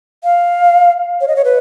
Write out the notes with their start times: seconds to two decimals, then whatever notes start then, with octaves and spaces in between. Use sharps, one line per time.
0.24 F5
1.21 C#5
1.28 D#5
1.36 C#5
1.45 B4